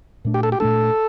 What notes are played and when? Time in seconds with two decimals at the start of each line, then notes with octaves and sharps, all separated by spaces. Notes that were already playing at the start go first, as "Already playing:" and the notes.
0.25 A#2 A3 D4
0.34 G4
0.43 A4
0.52 G4
0.60 A#2 A3 D4 A4